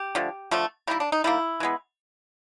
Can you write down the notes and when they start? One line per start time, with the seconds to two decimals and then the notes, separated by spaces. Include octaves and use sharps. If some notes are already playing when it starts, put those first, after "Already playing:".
Already playing: G4
0.15 D3 F3 A3
0.51 D3 F3 A3
0.87 D#3 G3 A#3 E4
1.00 D4
1.12 D#4
1.24 D#3 G3 A#3 E4
1.60 E3 G#3 B3